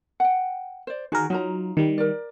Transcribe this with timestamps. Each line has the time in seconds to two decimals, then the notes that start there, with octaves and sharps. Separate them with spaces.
0.20 F#5 G5
0.87 C5 D5
1.12 D#3 F#4 G#4 A#4
1.30 F#3 D#4 F4 A#5
1.77 D#3 G3
1.98 A#4 D5